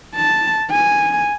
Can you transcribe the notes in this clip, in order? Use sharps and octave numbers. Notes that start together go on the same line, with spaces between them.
A5
G#5